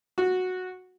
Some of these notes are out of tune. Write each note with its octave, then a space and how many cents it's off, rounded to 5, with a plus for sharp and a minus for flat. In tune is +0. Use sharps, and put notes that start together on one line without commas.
F#4 -10